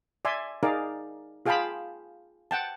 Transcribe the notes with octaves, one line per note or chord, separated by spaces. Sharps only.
D5 E5 G#5 C6
D#4 G#4 A#4 D5 F5
F4 G#4 F5 G5 A5 B5
F#5 G5 A5